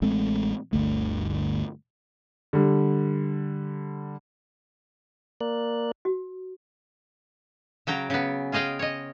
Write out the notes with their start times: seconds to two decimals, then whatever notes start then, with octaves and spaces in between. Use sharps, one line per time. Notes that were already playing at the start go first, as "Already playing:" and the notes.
0.02 A1 G#3 A3 C4
0.73 G1 D2 A3
2.53 D3 G3
5.41 A#3 A#4 D5 F#6
6.05 F#4
7.87 C#3 F#3 G5 A#5
8.10 C#3 B3
8.52 F4 G#4 D#5 F5 G5
8.79 C#5 D#5